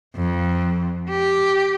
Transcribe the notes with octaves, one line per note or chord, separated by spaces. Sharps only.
F2
G4